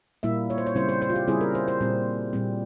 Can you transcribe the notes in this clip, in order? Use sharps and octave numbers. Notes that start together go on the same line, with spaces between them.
A#2 G3 A#3 E4 E5
C#5
C5
C#5
C#3 G3 C4 E4 C5
C5
C5
F4
G4
C#3 G3 C4 E4 G#4
A#4
C5
C5
A#2 G3 C4
A#2 G3 C4